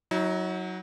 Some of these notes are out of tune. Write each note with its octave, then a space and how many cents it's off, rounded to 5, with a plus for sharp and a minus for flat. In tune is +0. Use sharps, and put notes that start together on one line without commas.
F#3 +0 D#4 +45